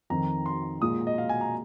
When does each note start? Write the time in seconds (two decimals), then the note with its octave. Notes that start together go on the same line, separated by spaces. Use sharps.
0.10 F2 D#3 C4 D#4 A#5
0.46 C6
0.82 A#2 G#3 F4 D#6
1.07 D#5
1.18 F5
1.29 G#5
1.41 A#5